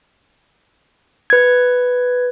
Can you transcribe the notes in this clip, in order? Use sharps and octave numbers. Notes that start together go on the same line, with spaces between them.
B4 G#6